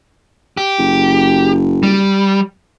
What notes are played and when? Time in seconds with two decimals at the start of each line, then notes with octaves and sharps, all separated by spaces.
0.57 G4
0.79 F#1
1.83 G3